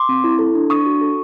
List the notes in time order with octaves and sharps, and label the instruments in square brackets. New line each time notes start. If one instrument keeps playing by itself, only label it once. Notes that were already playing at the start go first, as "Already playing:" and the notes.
Already playing: [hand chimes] C6 D6
C4
E4
A4
D4
D4 C#6 D#6
F#4
A4